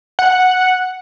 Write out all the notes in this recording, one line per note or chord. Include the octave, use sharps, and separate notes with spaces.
F#5